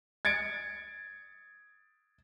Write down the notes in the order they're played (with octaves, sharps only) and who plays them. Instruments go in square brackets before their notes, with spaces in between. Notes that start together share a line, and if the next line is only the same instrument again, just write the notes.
[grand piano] G#6 A6 C#7 D7